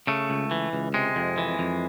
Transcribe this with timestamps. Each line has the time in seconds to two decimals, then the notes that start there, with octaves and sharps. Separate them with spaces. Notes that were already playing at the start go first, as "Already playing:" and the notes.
0.07 C#3 A3
0.30 C#2
0.51 E3
0.73 C#2
0.94 C3 G#3
1.16 F2
1.38 E3
1.59 F2